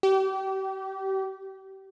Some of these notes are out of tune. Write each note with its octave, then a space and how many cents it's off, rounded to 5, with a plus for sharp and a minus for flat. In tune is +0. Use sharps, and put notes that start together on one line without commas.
G4 -30